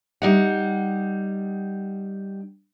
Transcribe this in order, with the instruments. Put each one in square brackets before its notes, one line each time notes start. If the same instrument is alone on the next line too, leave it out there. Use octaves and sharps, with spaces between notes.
[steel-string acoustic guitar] G3 D#4 F#5